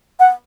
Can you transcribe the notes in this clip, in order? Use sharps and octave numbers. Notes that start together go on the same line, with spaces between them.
F#5